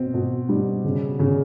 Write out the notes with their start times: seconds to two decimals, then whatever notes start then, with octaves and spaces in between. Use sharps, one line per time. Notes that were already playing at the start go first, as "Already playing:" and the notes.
Already playing: B2 C4
0.14 B2
0.49 G3
0.84 C#3
1.19 C#3